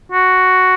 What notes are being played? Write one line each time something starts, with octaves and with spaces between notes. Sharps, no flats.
F#4